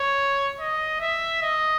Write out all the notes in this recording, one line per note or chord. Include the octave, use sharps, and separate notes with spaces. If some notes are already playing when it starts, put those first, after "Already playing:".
Already playing: C#5
D#5
E5
D#5